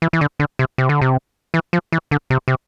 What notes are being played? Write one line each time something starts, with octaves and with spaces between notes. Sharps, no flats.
E3
E3
D3
D3
C3
C3
D3
C3
E3
F3
E3
D3
C3
C3